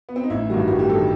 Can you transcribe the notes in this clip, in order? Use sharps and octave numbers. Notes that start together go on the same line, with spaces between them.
B3
C4
D#4
A1 E4
G2 D#3 G3 F#4
A1 F#4
G4
D#3 G3 A4